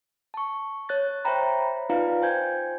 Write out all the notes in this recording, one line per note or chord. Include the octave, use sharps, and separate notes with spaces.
A5 C#6
C#5 F#6 A6
C5 C#5 E5 G5 A#5 B5
D#4 F4 B4 D5 F5 A#5
C5 G5 G#5 G6 G#6